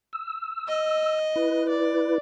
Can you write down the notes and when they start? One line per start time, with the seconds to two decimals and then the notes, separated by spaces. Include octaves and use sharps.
0.13 E6
0.68 D#5
1.36 E4 B4
1.69 D5